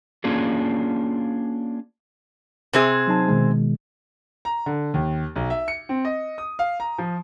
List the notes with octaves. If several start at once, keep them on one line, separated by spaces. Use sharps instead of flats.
A#3 C#4 D4 F4 G#4
C3 C4 G#4
F#3 D#4 A5
B2 D#3 G#3
A#5
D3
D#2
B1
E5
C#7
C4
D#5
D#6
F5
A#5
F3